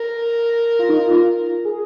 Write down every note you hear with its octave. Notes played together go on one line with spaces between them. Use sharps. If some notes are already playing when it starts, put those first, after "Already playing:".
Already playing: A#4
F4
D#4
F4
G#4